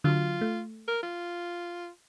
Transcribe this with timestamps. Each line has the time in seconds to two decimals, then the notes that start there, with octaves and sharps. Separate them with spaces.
0.04 D3 F#3 F4
0.41 A3
0.87 A#4
1.02 F4